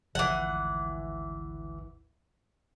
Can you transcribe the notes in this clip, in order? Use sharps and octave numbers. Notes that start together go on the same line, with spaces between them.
G#1 D2 E3 F3 F#5